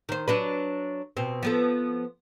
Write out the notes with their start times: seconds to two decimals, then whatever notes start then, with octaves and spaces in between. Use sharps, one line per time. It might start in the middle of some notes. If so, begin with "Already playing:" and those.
0.09 D#3 C5
0.28 F#3 D4 B4
1.17 B2 C4
1.43 F3 B3 A4